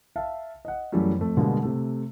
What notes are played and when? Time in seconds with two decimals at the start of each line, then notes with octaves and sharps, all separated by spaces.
0.16 E5 F5 A5
0.65 D#5 F#5
0.92 F#2 E3 F#3 G3 A3
1.18 F2 A3
1.37 B2 D3 G3 G#3 A#3
1.63 C3 A3